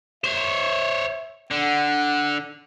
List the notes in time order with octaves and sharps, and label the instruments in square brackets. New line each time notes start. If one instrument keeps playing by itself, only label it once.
[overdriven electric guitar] C5 C#5 [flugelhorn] E5
[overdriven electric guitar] D3 [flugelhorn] F#5